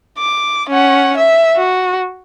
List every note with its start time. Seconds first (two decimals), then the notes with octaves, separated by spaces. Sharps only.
0.18 D6
0.69 C#4 F#5
1.17 E5
1.56 F#4